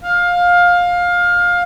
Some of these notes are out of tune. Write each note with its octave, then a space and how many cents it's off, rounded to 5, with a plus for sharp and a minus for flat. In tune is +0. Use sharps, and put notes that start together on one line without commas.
F5 +20